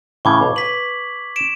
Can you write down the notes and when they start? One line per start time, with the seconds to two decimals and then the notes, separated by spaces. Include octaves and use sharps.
0.25 A2 C#3 E3 C#6 D6 G#6
0.41 B1 F5
0.56 B4 B6 F#7
1.36 D7 E7